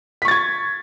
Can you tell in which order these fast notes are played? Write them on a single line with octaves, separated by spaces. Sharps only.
B6 C#6 A6 G#6